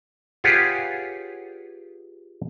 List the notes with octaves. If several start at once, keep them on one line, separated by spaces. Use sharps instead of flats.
F4 G4 G#4 B4 C#5 F#5